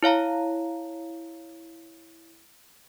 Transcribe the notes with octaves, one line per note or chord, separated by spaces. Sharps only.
E4 C#5 F5 A#5